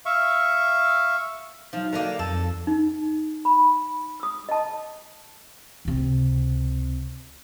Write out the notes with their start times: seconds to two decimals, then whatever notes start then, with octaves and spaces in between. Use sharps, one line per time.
0.06 E5 F5 C#6
1.73 F3 F#3 D#4
1.93 D3 D#3 A#3
2.19 F2 A4
2.67 D#4
3.45 B5
4.20 D#6 E6
4.49 D#5 A5
5.85 C#2 C3